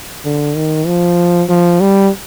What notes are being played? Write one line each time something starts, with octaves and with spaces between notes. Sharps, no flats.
D3
D#3
F3
F3
G3